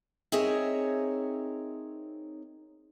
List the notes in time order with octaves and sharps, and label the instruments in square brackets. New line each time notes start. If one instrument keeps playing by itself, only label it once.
[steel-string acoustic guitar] C4 D#4 G#4 A#4 C#5 E5